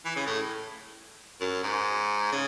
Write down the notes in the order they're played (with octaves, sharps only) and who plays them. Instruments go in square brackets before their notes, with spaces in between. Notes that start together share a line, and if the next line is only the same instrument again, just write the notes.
[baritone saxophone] E3
C#3
A2
F#2
G#2
C#3